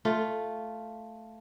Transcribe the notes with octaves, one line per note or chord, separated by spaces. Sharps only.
A3 F4